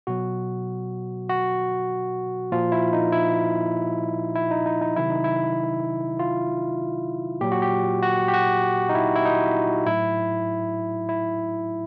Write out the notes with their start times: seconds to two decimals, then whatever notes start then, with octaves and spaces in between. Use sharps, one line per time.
0.07 B2 F#3 F#4
1.29 F#4
2.52 A#2 F3 F4
2.72 E4
2.93 D#4
3.12 E4
4.36 E4
4.51 D#4
4.66 D#4
4.81 D#4
4.96 C3 D#3 F#3 E4
5.10 D#4
5.24 E4
6.19 F4
7.41 A#2 F#3 G4
7.52 F#4
7.62 G4
8.03 F#4
8.28 G4
8.34 F#4
8.89 D#4
8.95 E4
9.16 E4
9.25 D#4
9.86 A2 F#3 E4
11.09 E4